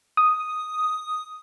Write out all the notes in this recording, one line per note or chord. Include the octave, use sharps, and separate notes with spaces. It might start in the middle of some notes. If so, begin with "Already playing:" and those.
D#6